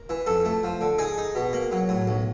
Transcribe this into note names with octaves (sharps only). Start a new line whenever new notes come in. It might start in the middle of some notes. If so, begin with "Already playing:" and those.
Already playing: A#4
E3
F2 A4
A3
F3
D3
D#4 G#4
D#4
B2
A#3
F#3
A2
B1